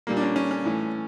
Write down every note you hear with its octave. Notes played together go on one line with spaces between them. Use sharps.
A#2 G3 A#3
D4
C#4
C#4
C#4
A2 E3 A3